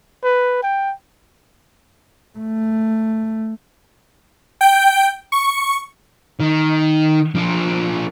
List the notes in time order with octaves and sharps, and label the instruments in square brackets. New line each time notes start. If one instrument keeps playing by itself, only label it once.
[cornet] B4
G5
[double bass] A3
[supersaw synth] G5
C#6
[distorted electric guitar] D#3
F3 D4